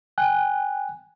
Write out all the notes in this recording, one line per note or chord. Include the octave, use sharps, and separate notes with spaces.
G5 G#5 F#6